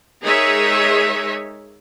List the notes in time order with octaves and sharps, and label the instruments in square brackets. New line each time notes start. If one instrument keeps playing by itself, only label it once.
[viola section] G#3 D#4 G#4 A#4 C#5 E5